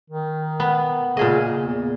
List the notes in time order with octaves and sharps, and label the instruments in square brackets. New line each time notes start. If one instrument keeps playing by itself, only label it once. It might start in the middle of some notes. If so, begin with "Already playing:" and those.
[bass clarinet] D#3
[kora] B3
[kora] A#2 G#4 D#5 [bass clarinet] C#3
[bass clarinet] E2